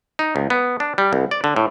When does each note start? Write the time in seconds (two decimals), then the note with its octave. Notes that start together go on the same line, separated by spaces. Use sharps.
0.19 D#4
0.36 C#2
0.50 B3
0.80 D4
0.98 G3
1.13 C2
1.31 D5
1.44 D3
1.56 A2